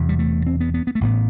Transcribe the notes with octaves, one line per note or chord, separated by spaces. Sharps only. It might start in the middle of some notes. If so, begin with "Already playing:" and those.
Already playing: E1 E2 C3
G3
A3
C4
B3
B3
B3
A3
A1 A2 B3